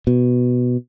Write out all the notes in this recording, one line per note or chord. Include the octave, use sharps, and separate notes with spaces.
B2